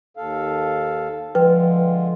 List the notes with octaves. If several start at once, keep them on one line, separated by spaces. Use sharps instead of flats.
D#2 A4 F5
D3 F3 G#3 F4 B4 G5